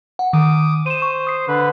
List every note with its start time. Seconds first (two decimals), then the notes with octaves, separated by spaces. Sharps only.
0.19 F#5
0.33 D#3 D6 D#6
0.86 C5 D#7 E7
1.02 C#6
1.27 D#6 C7
1.48 D3 B4